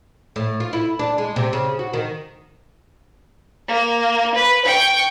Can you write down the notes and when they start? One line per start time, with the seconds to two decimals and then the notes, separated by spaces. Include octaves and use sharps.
0.36 A2
0.60 F4
0.73 E4
0.99 D4
1.18 G#3
1.36 C3
1.53 C#3
1.79 F#4
1.93 D#3
3.68 A#3
4.35 B4
4.65 G5 C#6